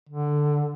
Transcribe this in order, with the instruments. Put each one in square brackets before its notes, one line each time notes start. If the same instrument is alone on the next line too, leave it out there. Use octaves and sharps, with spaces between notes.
[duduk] D3